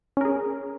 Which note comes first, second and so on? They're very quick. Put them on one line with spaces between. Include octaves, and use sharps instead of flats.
C#4 A#4 G#4